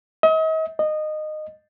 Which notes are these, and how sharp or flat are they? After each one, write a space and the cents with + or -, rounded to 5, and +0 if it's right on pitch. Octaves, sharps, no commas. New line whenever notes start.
D#5 +40
D#5 -20